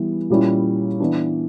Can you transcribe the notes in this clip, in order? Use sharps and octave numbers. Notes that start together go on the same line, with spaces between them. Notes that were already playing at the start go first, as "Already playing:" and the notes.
Already playing: E3 G3 B3
A#2 G3 C#4 E4
E3 B3 D4